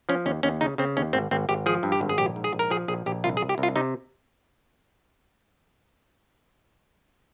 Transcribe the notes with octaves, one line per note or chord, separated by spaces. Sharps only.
F3 C#4
D#2 C#4
D#2 C#4
C#3 D#4
C#3 C4
D#2 C#4
G#1 C4
G#1 C4
G#1 G4
F3 G#4
G2
G4
G#1
G#4
A#1 G4
G#2
G#4
A#1
A#4
F3 G#4
A#1 G#4
A#1 G4
C2 F4
G#4
C2
G4
C2
F4
C3 D#4